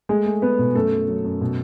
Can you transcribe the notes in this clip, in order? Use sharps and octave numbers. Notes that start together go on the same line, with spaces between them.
G#3 A3 G#4
A3
A3 B3 B4
B2
F#2 A3 A4
F#3
F#3
F#2
B2